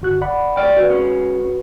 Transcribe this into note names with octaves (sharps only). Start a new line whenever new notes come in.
G1 F#4 F#6
D5 F#5 B5
D2 D5 G5 F6
F#4 B4
G#3 C#4